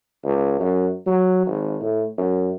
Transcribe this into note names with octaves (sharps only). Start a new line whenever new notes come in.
C#2
F#2
F#3
G#1
A2
F#2